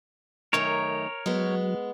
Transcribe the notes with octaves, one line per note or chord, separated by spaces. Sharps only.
F#2 D#3 A3 A#4 C#5
F#3 G#3 B3